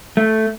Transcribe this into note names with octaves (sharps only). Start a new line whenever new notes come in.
A3